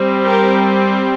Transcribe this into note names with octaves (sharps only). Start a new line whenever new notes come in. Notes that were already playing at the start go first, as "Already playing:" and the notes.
Already playing: G3 C4
G4 A#4